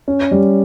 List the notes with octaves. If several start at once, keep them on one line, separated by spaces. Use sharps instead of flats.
C#4
G3